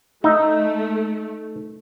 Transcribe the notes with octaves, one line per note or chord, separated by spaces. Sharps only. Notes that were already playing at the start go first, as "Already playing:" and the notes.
A3 D#4 E5